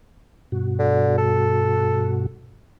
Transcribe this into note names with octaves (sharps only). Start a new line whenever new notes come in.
G2 B2 F#4
D3
A4